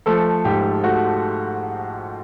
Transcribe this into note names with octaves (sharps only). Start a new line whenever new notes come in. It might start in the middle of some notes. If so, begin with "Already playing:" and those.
F3 A3 A4
G#2 G4
A3 F#4